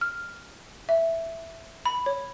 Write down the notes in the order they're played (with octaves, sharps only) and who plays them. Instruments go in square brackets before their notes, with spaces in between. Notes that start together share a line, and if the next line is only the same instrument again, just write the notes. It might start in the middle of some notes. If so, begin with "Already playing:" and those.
[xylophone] F6
E5
B5
C#5